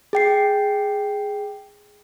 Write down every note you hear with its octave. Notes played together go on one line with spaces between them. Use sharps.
G#4 G5 C7